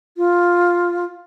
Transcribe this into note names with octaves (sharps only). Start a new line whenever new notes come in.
F4